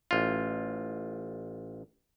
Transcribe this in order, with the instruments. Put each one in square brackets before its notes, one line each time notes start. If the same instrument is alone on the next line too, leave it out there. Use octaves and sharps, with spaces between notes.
[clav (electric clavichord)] A1 F4